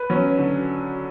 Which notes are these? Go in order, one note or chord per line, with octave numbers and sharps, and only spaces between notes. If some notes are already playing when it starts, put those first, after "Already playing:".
Already playing: B4
F#3 C#4
D3